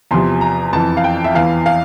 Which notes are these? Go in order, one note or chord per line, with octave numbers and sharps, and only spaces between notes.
E2 C3 F3 C6
A#5
F2 E3 A5
F5
G5
E5
E2 E3 F5
F5